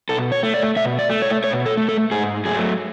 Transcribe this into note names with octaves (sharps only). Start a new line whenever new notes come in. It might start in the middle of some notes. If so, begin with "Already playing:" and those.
B2 A4
C#5
A3
D5
B2 E5
D5
A3
C#5
B2 C#5
A4
A3
A4
G#2 G#4
F#3 A3 G#4